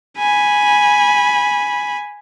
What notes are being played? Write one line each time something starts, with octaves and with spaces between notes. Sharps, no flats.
G#5 B5